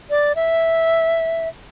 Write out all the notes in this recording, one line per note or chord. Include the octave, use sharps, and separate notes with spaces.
D5
E5